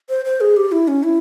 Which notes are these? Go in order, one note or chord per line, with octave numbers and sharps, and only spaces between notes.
C5
C5
G#4
G4
E4
C#4
E4